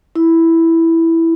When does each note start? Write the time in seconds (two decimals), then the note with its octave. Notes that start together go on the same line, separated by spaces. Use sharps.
0.15 E4